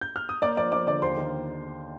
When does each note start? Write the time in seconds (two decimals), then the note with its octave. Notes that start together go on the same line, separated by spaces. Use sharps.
0.01 G6
0.16 F6
0.29 D#6
0.42 A#3 D5 D6
0.57 F3 D5 D6
0.72 F3 D5 D6
0.87 D3 D5 D6
1.02 D#2 C5 C6
1.17 D#3